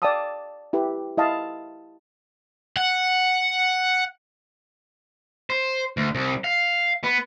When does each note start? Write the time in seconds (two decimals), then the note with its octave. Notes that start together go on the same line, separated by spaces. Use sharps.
0.02 D5 F5 G5 A5 D#6 E6
0.73 E4 G4 B4
1.18 E4 D#5 F5 A5
2.77 F#5
5.50 C5
5.97 D2
6.15 C2
6.44 F5
7.04 B3